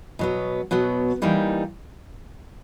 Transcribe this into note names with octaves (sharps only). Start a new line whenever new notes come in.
B2 F#3 B3
B2 F#3 B3
E3 G3 A#3 D#4